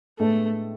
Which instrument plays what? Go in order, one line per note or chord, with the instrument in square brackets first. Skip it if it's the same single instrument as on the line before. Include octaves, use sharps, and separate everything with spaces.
[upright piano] A2 G#3 B3 D4 A4 [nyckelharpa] A3